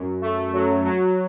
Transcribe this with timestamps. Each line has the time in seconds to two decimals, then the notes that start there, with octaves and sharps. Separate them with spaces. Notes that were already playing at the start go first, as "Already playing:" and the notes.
Already playing: F#2
0.21 A3
0.53 F#3
0.85 F#3